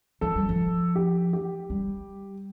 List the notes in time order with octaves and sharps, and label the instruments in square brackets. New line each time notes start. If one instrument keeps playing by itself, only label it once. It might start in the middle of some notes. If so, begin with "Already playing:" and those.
[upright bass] F3 [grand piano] A4
[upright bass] G3
F3
[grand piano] G4
G4
[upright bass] G3